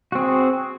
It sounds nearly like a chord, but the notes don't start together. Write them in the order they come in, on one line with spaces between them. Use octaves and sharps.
F#4 C4 G#4